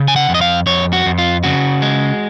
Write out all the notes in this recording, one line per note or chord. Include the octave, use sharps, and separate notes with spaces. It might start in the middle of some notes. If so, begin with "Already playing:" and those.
Already playing: C#3
G#5
F#5
F2
D#5
F5
F2 C#5
F#4
F2
F4
C#3 F#4
G#3